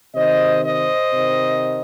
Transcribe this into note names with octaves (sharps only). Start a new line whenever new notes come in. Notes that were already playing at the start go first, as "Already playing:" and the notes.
C3 D#3 C5 D#5
C5 D#5
C3 D#3